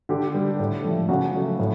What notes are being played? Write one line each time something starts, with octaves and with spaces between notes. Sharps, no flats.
D3 G4
G3
A2
F3 A3
C#3 F#4
F#3 A3
A2